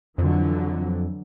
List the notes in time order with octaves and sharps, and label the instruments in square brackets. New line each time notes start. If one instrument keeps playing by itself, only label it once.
[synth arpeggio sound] F2 [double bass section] D3 E3 F#3